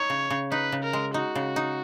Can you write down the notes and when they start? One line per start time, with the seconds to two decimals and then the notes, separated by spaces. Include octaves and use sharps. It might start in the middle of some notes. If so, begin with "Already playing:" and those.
Already playing: D#4 C#5
0.10 C#3
0.30 C#3
0.52 D#4 B4
0.72 C#3
0.83 A#4
0.93 G#3
1.14 D#4 F#4
1.35 C#3
1.56 D#4